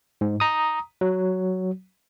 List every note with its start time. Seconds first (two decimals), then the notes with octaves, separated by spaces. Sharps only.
0.21 G#2
0.40 A#5 D#6
1.01 F#3